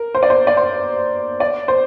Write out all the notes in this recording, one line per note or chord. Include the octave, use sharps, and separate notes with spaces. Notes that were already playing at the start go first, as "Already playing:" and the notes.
Already playing: A#4
C5
D5
C5
D5
C5
D5
C5